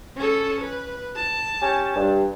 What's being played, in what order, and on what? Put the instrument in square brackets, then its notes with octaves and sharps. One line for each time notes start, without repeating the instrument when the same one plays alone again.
[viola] C#4 A4
B4
A5
[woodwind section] C#4 G4 G#5
G2